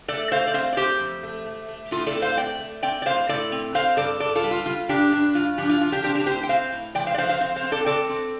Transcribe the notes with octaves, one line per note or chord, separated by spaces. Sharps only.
A3 A4 D5
A3 C5 F5
D5
C4 C5 F5
D5
A3 G4 C5
F2
A3
A3
A3
A2 F4 A4
A4 D5
C4
C5 F5
A3 D5 G5
A3
C4 D5 G5
D5
A2 C5 F5
A2 A4 D5
C4
C4 C5 F5
G2 A4 D5
G2 A4 D5
F4 A4
G3
F4
G3 F4
G2 D4 G4
G2 D4
G2 F4
F3 D4 G4
F4
F3 F4
D4 G4
C4 D4 G4
D4 G4
A2 G4 C5
G5
C4 C5 F5
A2
F3 D5 G5
C5 F5
D5
F3 C5 F5
C5 F5
C4 C5 F5
C5 F5
C4
A4 D5
C4 A4 D5
C4